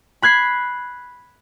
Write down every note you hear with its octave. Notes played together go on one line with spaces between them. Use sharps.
B5 F#6 G#6 C7